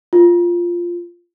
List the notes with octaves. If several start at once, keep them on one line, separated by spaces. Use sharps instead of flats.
F4